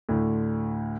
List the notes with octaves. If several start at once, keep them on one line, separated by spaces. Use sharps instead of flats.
D2 A2 D3